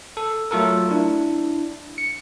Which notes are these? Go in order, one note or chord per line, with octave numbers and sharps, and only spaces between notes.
A4
F#3 A3 F4 A4 A#4
D4 E4
C#7